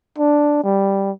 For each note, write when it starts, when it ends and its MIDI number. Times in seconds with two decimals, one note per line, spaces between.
0.18 0.59 62
0.63 1.11 55